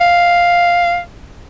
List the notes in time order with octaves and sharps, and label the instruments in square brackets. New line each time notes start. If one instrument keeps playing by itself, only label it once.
[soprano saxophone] F5